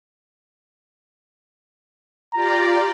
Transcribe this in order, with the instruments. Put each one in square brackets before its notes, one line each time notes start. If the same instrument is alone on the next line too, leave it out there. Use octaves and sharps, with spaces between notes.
[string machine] F4 G4 D5 [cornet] A#5